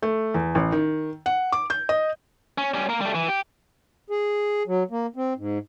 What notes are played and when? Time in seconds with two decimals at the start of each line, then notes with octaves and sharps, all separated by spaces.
0.02 A3
0.34 E2
0.55 A1
0.72 D#3
1.26 F#5
1.52 D6
1.70 G6
1.89 D#5
2.58 C#4
2.74 G3 C#4
2.89 A#3 A#4
3.01 G3 A3
3.15 E3
3.29 G4
4.10 G#4
4.67 F#3
4.91 A#3
5.16 C4
5.37 G#2